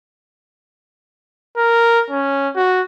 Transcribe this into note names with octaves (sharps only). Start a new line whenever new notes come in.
A#4
C#4
F#4